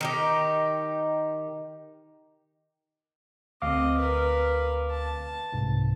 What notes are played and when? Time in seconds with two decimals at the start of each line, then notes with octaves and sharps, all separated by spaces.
0.01 D#3 D#4 G4
3.62 D2 C4 D#5 F5 D6
3.97 A#4 B4
4.90 A5
5.53 C2 G#2 C3